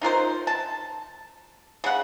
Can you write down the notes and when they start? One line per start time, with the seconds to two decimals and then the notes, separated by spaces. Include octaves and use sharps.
0.01 D#4 F4 A#4 C5
0.47 A5
1.84 C#3 F#5